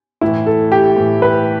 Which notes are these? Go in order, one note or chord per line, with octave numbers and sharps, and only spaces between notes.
A2 E3 E4
A4
G4
A2 E3
B4